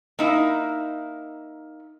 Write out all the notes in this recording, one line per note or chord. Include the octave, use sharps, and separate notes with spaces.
A#3 D#4 E4